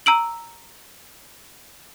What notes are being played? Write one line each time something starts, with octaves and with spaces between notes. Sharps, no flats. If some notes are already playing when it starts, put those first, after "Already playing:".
A#5 E6 D7 F#7